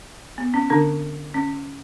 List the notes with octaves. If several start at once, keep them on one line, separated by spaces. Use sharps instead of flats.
B3
C#4
D3 D4
C#4